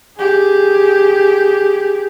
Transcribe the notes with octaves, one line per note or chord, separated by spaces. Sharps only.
G4 G#4